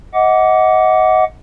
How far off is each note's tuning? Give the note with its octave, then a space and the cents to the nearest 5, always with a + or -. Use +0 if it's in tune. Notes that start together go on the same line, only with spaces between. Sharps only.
D#5 +25 F#5 +0 D6 -20